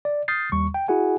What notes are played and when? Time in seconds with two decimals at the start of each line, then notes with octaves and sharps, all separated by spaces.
0.05 D5
0.28 D#6 F6 G6 A6 C7
0.52 D#2 G3 C#6
0.74 G5
0.88 E4 F#4 G#4 F#5 G#5